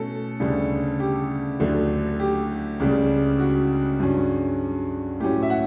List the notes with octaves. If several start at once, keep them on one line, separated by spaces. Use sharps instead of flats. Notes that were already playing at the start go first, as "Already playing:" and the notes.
Already playing: B2 A3 C#4 A4
D2 C#3 G3
G4
D2 D3 F#3 A3
G4
C#2 C#3 G3
F#4
G2 F#3 C#4
A2 F#3 C#4 G4
E5
F#5